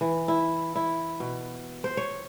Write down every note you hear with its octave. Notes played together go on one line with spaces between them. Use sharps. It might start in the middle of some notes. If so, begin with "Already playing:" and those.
E3
E4
E4
B2
C5
C#5